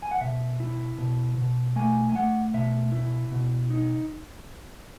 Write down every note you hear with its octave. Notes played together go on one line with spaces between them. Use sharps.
G#5
F#5
B2 E5
E4
B2
B2
A3 G#5
G#5
A3 F#5
B2 E5
E4
B2
D#4